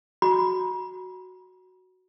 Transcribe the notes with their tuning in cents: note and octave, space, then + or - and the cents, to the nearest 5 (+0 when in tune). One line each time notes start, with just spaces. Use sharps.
F#4 +0 A#5 +45